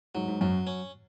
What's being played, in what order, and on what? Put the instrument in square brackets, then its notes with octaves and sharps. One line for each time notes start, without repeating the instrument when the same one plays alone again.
[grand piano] G#2 [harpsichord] F#3
[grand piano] G#2
[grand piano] F#2 [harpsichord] F#3
[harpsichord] C#4